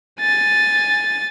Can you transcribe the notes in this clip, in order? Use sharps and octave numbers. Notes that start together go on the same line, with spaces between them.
G#5 A6